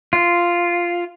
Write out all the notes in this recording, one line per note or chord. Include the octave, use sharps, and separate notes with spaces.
F4